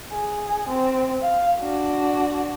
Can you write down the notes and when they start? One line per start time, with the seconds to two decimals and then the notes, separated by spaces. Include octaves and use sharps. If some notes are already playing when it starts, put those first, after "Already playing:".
0.13 G#4
0.69 C4
1.23 F5
1.60 D4 F#4